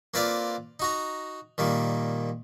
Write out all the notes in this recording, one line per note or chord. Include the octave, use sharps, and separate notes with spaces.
A#3 C4 F4 B4 D5 F5
D#4 F#4 A#5
A#2 D#3 G3 A#3